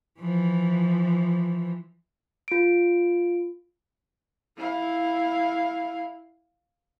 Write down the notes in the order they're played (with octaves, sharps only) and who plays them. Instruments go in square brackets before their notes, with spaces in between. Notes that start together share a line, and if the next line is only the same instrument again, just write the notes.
[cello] E3 F3
[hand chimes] F4 D7
[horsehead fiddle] E4 F5